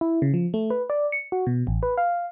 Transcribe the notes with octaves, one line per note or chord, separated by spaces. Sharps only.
E4
C#3
F3
A3
B4
D5
C#7
F#4
B2
A1
B4
F5